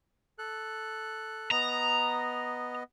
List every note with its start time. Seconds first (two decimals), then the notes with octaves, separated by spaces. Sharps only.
0.39 A4 F#6
1.51 B3 D#5 A#5